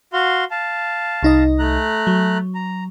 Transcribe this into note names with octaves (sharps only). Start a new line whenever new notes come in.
F#4 F5 C6
F5 A5
C2 D#4 D#5
A3 A#5 F#6
F#3
A#5